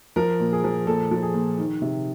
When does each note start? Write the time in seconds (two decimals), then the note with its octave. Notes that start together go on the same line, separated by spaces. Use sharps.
0.16 F3 A#4
0.40 A#2
0.53 G#4
0.64 F3
0.87 A#2 A4
1.11 F3
1.22 G#4
1.34 A#2
1.58 D#3
1.82 C3